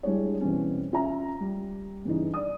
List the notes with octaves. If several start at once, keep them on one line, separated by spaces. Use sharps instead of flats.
G3 G#3 D4 E4 C#5
B2 E3 G3 C4 C#4
C#4 F4 E5 A#5
G3
G2 C#3 E3 D#4
D5 D#6